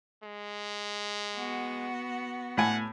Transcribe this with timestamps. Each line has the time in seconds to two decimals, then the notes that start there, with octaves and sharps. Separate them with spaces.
0.24 G#3
1.35 B3 F#4
2.57 A2 F#5 G#5